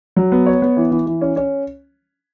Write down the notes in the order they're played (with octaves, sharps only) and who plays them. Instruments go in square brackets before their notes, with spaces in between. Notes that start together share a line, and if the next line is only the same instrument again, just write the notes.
[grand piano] F#3
B3
C#5
B3
E3
E3
E3
C#4
C#4